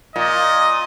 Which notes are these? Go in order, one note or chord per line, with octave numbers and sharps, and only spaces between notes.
A#2 D#5